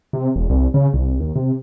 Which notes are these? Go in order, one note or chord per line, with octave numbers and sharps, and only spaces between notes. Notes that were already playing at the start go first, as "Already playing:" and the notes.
C3
E1
C2
C#3
C2
D#2
C3